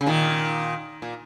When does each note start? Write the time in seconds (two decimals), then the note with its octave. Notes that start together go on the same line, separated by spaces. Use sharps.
0.01 C#3
0.07 A#2 D#3
1.02 A#2